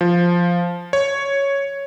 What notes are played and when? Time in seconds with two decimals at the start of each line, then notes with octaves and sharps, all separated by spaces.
0.01 F3
0.93 C#5